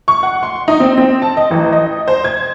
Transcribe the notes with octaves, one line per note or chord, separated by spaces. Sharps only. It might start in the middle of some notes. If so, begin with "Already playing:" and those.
C#6
F#5
C6
D#4
C4
C4
A5
D#5
A1
D#5
C5
G#6